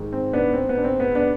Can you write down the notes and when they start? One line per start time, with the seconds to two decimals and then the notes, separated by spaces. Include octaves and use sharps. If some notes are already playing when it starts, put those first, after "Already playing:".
Already playing: G#2 D#3
0.13 C4
0.33 B3 D4
0.53 C4
0.69 B3
0.77 D4
0.84 C4
1.00 B3
1.15 B3 D4